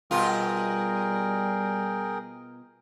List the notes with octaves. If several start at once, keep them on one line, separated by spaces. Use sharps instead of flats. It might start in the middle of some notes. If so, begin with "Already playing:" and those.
B2 G3 F4 G#4 A#4 G5